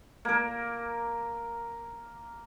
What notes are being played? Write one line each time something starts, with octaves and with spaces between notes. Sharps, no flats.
A#3 A#4